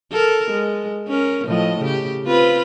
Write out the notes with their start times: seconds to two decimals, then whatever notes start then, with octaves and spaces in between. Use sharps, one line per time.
0.12 A4 A#4
0.51 G#3
1.08 C#4 A#4
1.45 A2 F3 D#5
1.81 C#3 G4
2.26 C4 F4 B4